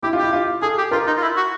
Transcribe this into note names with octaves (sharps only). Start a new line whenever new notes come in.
E4 G4
F4
E4 G4
F4
G#4 A4
G4
F4 A#4
D#4
F4
E4
F#4